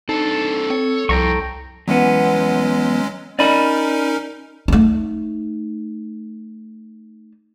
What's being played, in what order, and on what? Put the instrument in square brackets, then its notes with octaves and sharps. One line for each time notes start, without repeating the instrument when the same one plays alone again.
[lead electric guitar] C4 D4 [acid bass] D#4 [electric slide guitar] A4
[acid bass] C4 [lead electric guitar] C#5
[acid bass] C2 [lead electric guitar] F2 [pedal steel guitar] G5 A#5 C#6
[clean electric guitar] E2 B3 [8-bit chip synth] F#3 G#3 C#4
[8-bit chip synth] C#4 D#4 A#4 [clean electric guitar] D5 D#5 B5
[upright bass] A3 D#4